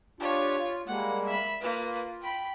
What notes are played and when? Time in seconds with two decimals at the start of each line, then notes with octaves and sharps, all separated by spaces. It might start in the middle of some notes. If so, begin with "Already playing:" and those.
0.20 D4 F4 G4 C#5
0.58 F4
0.87 G3 G#3 A#3 F#5
1.26 E5 B5
1.61 A#3 F4 B4
2.22 G5 B5